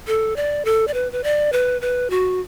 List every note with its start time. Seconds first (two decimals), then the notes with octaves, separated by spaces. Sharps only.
0.07 A4
0.36 D5
0.65 A4
0.87 D5
0.94 B4
1.12 B4
1.24 D5
1.52 B4
1.81 B4
2.10 F#4